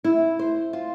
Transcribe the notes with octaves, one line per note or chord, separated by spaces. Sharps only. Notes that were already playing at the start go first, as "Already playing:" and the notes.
E4
C5
F4